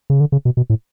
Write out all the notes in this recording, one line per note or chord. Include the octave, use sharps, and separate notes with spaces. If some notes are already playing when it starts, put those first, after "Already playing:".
C#3
D3
C#3
B2
B2
A2